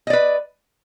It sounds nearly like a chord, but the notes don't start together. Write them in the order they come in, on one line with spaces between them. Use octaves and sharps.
D#5 D5 B4